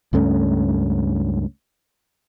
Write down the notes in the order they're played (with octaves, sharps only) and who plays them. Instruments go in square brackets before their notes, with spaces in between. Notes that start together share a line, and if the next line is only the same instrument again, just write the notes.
[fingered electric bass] C#2 G2 A3 C#4